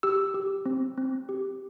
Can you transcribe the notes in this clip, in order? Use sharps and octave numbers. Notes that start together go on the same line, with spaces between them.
G4 E6
G4
C4
C4
G4